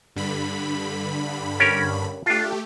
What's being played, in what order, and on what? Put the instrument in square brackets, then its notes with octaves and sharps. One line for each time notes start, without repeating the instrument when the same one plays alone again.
[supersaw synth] G2 D3 B5
[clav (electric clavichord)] C#4 G4 A#4
[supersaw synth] A3 G4 [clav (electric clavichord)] D4 F4